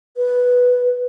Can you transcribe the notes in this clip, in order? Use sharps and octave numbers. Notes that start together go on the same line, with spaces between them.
B4